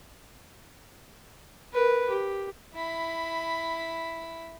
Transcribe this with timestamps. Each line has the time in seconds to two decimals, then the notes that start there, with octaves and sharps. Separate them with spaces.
1.73 A#4 B4
2.09 G4
2.74 E4 B5